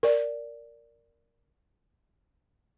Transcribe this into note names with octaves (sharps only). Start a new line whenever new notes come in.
A#4 D5